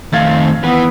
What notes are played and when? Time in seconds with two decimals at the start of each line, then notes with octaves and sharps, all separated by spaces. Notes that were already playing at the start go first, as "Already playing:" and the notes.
0.13 F2 D#3 A3 C4 F5 G#6 A6
0.63 E3 B3 B4